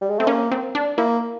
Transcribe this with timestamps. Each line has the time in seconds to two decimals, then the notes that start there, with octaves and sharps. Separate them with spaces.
0.01 G3
0.10 G#3
0.19 A3 C4
0.27 A#3 C#4
0.52 C4
0.75 D4
0.98 A#3 E4